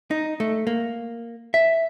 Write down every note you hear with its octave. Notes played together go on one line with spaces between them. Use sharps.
D#4
A3
A#3
E5